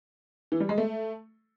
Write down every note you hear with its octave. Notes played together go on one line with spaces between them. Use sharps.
E3
G3
G#3
A3